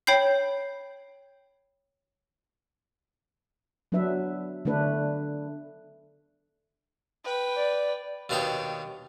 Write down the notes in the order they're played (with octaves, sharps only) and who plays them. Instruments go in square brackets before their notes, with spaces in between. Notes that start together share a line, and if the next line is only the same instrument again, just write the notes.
[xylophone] C#5 G5 B5 G6 C7
[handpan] F#3 B3 D4 B4 E5
D3 A3 D4 B4
[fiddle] B4 G5
[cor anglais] D5
[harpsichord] D#2 B2 D4 D#4 C#5 G5